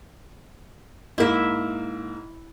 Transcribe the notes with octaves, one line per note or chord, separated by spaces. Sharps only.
G#2 A#3 E4 E5